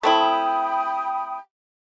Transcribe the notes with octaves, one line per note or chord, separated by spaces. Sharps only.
A3 C4 E4 G5 B5 D#6